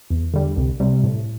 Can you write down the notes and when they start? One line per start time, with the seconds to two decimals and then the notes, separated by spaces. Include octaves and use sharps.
0.10 E2
0.34 D3 G3
0.57 C2
0.80 C3 G3
1.04 A2